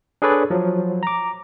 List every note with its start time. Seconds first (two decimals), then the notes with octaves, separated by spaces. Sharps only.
0.22 D4 G#4 A4 B4 C#5 D5
0.50 F3 F#3
1.03 A#5 D6